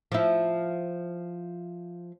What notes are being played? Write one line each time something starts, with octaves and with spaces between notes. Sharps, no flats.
F3 E4